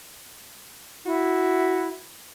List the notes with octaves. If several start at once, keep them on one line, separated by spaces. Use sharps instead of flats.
E4 F#4